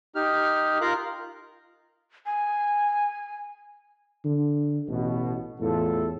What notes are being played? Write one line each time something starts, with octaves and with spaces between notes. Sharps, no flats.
D#4 G4 F6
F4 A#4 F5 A#5 F#6
G#5
D3
A1 B2
E2 A2 F4 A4